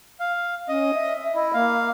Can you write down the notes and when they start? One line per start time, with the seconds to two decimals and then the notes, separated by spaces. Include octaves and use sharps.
0.20 F5
0.68 C#4 D#5
0.94 E5
1.35 E4 D#5
1.54 A#3 F5